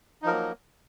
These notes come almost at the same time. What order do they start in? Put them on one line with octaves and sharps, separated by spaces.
D#4 F3 A#4 F#3 A#3